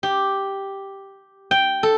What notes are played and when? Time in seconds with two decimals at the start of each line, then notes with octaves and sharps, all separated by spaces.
0.03 G4
1.51 G5
1.83 A4